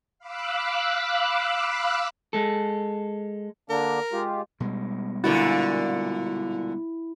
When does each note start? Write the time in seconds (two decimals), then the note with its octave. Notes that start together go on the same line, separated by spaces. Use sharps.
0.19 F5 B5 D6 E6 F#6
2.33 G#3 A4
3.70 D3 A#3 D4 A#4
4.13 G#3 F4 G4
4.60 B2 G3 G#3
5.24 A#2 D3 E4 F#4